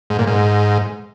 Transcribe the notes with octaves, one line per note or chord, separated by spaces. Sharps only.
G#2
A#2
G#2